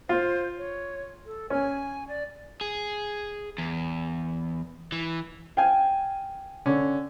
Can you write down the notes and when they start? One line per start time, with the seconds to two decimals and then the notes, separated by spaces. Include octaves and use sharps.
0.09 F4 C5
0.57 C#5
1.26 A4
1.50 C#4 G#5
2.08 D5
2.61 G#4
3.58 E2
4.92 E3
5.57 F5 G5 G#5
6.66 D3 C#4